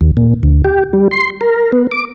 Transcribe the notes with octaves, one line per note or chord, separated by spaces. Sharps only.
D#2
A#2
D2
G4
G3
C6
A#4
B3
D6